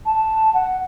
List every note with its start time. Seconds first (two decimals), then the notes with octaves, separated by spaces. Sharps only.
0.06 A5
0.54 F#5